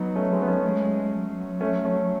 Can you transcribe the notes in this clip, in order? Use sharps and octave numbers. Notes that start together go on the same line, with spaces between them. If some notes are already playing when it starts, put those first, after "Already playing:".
Already playing: F#3 B3 D#4
A3 C#4
G#3 B3
B3
A3 C#4
G#3
F#3
A3 C#4
A3 C#4